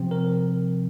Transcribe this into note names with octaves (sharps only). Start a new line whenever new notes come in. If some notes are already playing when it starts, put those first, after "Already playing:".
Already playing: C3 F3 C4
A#4